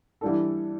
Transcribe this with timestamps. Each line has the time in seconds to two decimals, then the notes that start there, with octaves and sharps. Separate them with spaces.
0.21 E3 G3 D4 A4